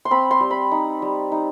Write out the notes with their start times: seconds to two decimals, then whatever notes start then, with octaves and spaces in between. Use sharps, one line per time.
0.05 C6
0.11 C4 B5
0.31 C6
0.40 G3
0.51 B5
0.71 D#4
1.02 G3
1.32 D#4